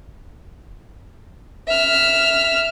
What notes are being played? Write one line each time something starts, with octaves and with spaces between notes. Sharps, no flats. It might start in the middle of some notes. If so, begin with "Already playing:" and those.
E5 F6